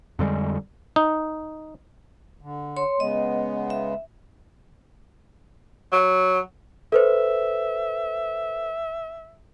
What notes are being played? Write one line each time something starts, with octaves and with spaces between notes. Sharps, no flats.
F2 D3 G3 G#3
D#4
D3
C#5 C6
C#3 G#3 B3 D#5
E5
F#3
A4 B4 C5 E5